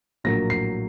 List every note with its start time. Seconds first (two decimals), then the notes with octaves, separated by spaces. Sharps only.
0.24 A#1 A2 F#3 A#3 A#6
0.50 C7